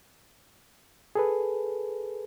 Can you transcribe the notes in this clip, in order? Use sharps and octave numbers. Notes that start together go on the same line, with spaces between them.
G#4 A4 B4